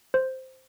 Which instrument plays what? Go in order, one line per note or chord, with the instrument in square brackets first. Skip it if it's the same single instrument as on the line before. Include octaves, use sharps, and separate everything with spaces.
[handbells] C5